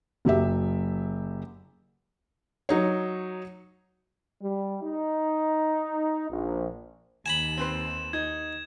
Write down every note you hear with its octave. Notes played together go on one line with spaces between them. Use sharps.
F#1 F#3 G4 E5
F#3 D#4 C#5
G3
D#4
A#1
D#2 G#5 A#5 B5 E7
C4 B4 C6
D#4 G#6